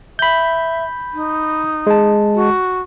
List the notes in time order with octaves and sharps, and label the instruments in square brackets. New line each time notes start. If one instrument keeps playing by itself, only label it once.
[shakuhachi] E5 [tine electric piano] B5 G6
[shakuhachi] D#4
[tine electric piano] G#3 A5
[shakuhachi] F#4